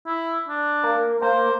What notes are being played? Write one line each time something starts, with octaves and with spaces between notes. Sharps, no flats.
E4
D4
A#3
A#3 C5